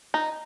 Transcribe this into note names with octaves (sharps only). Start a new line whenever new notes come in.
D#4